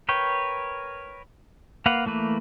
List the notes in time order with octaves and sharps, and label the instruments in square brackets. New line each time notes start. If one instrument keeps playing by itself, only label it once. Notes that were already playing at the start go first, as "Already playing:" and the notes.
[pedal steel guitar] A#4 B4 C#5 G5
A#3 B4 F5 F#5
E3 A3 A#3 B4